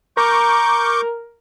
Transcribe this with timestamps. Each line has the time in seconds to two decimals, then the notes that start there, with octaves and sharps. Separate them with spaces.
0.17 A#4 C#6 D6 G6